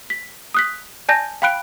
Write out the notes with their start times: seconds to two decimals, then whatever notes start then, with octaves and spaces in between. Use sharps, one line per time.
0.10 B6
0.54 D#6 F#6 B6
1.09 D5 G#5 A5 G6 A#6
1.42 F5 G5 B5 F#6 D7